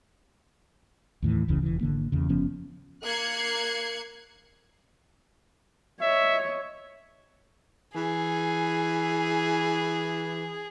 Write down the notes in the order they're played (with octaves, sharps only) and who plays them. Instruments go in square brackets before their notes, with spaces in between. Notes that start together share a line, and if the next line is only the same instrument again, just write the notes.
[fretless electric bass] D#2 A2 E3
F1 C#2 C#3 E3
E1 E3
G#1 D3 A#3
E2 C#3
F#1 F3 B3 C#4
[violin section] A#3 F#6 G#6 C7 C#7
[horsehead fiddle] C#5 D#5 [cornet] E5
[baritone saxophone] E3 [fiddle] G#4